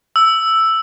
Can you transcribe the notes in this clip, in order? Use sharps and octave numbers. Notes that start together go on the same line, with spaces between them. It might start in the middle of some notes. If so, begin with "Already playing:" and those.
E6